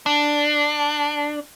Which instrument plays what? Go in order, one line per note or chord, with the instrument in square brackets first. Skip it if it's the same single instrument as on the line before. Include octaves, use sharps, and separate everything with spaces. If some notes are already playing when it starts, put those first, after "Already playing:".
[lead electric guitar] D4